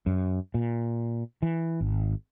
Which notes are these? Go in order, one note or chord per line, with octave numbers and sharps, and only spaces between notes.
F#2
A#2
E3
G#1